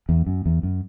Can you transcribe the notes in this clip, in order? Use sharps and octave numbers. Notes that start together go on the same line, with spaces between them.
E2
F#2
E2
F#2